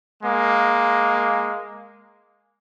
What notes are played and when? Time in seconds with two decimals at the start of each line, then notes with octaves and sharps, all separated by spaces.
0.22 G#3 A#3